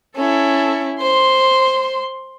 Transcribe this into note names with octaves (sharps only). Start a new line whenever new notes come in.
C#4 E4 A4
C5 C6